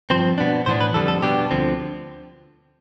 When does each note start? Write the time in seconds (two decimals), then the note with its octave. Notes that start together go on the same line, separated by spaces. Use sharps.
0.10 G2 F3 C4 C5
0.38 B2 B3 D4
0.66 A2 E3 B3 D4 C5
0.81 B4
0.94 F2 D3 G3 B3 D4 A4
1.08 A4
1.22 B2 G3 B3 D4 G4
1.51 D2 D3 F3 C4